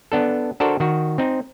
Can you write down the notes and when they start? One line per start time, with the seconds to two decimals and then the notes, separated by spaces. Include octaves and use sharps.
0.12 B3 D4 A4
0.60 D4 F#4 A4 A#4 C5 D5
0.80 D#3 F#4
1.18 C4 D#4